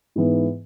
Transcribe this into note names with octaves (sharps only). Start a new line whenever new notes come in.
G#2 E3 B3